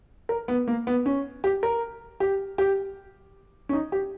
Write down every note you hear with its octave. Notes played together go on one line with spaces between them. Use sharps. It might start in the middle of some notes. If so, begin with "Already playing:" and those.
A#4
B3
A#3
B3
C#4
G4
A#4
G4
G4
C#4
D#4
G4